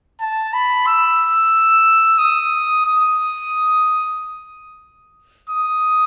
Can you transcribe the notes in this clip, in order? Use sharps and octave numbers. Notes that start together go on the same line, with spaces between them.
A5
B5
E6
D#6
D#6
D#6